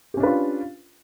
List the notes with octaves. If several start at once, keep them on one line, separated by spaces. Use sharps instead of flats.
C#4 D4 F4 G4 B4